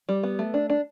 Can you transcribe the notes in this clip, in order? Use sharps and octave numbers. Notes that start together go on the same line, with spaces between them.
G3
B3
A3
D4
D4